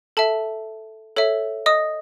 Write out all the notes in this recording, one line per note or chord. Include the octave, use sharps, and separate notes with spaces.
A4 E5 A5
A4 C#5 E5
D#5 D#6